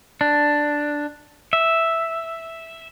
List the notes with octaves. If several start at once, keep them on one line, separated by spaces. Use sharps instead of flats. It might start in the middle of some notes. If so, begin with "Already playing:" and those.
D4
E5